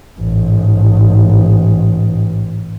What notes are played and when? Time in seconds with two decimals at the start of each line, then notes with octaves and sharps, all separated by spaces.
0.19 A1 G#2